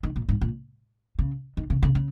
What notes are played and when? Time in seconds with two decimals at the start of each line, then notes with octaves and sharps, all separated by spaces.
0.03 D#3
0.16 A#2
0.29 G#2
0.41 A#2
1.19 C#3
1.57 D#3
1.70 C#3
1.83 C#3
1.95 C#3